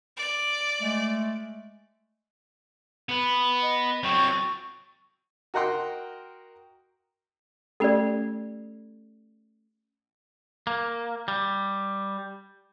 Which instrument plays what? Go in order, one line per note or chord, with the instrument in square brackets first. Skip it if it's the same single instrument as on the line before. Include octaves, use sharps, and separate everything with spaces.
[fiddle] D5
[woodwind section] G#3 A3
[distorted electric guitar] B3 B4
[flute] D#5
[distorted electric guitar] F#3 C4 [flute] C#6
[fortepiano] F#4 A#4 D#5 F#5 G5 C6
[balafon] A3 C#4 G4 [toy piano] A4 D5
[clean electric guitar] A#3
G3